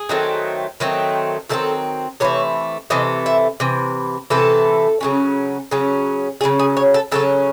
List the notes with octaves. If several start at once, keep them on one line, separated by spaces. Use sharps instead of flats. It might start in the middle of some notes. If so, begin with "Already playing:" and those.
Already playing: G#4
D#3 F#3 A3 C4
D#3 F#3 A3 C4
D#3 F#3 A3 C4 A4
C3 E3 A3 C#5
C3 E3 A3 D#5
E5
C3 E3
C3 E3 A3 A4
C#3 F#3 C#4
C#3 F#3 C#4
C#3 F#3 C#4 G#4
G#4
C#5
A4
C#3 F#3 C#4 A4